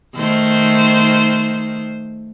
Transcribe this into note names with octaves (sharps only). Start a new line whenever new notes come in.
D#3 A3 C5